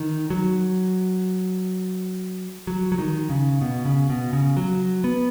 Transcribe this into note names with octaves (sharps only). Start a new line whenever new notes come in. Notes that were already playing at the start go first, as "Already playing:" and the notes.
Already playing: D#3
F#3
F#3
F#3
D#3
C#3
B2
C#3
B2
C#3
F#3
B3